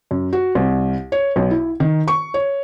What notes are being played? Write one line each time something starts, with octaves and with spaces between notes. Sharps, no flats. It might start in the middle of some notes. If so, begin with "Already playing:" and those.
F#2
F#4
C2
C#5
B1
E4
D#3
C#6
C#5